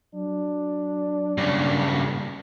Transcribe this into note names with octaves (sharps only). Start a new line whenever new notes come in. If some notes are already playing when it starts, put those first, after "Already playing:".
F#3 D4
G2 C#3